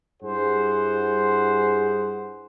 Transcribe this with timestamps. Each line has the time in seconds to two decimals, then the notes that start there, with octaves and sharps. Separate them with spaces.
0.23 G2 E4 G#4 C5 F#5